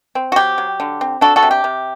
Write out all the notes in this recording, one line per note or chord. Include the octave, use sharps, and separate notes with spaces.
C4
F#4
F#3 G4
F#3
D3
C4
D4 F#4 A4
F#4 A4
C3
G4
C3